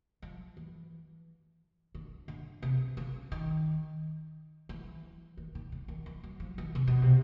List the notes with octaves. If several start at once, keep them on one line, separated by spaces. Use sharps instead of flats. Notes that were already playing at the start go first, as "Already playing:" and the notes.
F3
E3
D3
D3
C3
C#3
D#3
E3
D#3
D#3
C#3
D#3
E3
F#3
F3
E3
C3
B2
C3